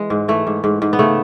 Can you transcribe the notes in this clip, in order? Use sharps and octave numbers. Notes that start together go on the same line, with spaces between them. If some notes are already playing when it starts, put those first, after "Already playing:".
Already playing: E3 G#3
G#2
E3 A3
G#2
G#2
G#2
B3
C#3 A3